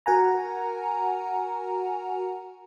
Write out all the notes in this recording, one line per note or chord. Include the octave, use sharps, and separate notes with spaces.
F#4 A#4 F#5 G#5 A#5